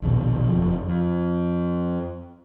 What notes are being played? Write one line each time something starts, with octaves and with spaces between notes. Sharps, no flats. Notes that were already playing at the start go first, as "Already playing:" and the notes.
A#1 D#2 B2
F#1 F2 F3
F2